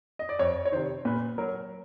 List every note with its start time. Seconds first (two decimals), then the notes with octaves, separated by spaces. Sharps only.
0.19 D#5
0.29 D5
0.39 F2 C#5
0.65 C#5
0.72 C3 D#3 C5
1.05 A#2 B4
1.38 F#3 A#4